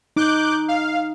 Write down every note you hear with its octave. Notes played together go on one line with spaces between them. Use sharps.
D#4 D6 F#6 G6
F5